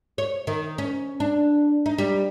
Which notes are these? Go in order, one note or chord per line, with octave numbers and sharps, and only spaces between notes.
C#5
D#3
C#4
D4
D#4
G3